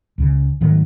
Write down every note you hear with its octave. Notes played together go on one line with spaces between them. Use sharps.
C#2 C#3
G#2 D#3 F#3 A3